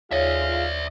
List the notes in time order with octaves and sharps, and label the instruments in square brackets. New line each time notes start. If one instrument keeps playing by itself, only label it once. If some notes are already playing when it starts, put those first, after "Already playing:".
[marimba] D#2 C#5 [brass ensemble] F4 G#4 F5 [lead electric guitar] D5 E5